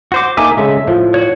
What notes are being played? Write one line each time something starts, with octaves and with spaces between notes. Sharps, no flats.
F#4 C5 D6
A#3 D#4 A4 E5 G#5 D6
C#3 G#3 A3 E5
A2 F3
F#4 C#5